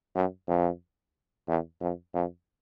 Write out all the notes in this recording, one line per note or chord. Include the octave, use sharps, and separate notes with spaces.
F#2
F2
E2
F2
F2